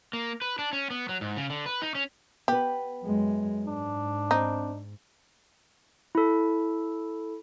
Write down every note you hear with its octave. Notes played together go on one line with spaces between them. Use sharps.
A#3
B4
D4
C#4
B3
F#3
G#2
C#3
D3
B4
D#4
C#4
B3 G4 B4
F#2 G#3
G#2 D4
C4 D#4
E4 A4